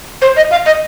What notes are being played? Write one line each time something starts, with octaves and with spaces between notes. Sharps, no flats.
C5
D#5
F5
D#5